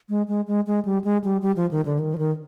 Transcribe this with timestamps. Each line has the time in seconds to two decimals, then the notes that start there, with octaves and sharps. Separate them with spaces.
0.09 G#3
0.28 G#3
0.47 G#3
0.67 G#3
0.85 G3
1.04 G#3
1.24 G3
1.42 G3
1.56 F3
1.71 D#3
1.85 D3
1.99 D#3
2.14 F3
2.18 D#3